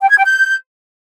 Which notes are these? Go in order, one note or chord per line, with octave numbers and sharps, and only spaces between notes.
G5
G#6
G5
G6